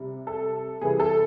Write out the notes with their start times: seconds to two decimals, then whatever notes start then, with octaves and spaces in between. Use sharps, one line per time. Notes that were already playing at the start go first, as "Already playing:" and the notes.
Already playing: C3 G3
0.27 A4
0.81 C3 E3 G3 G#4
1.00 A4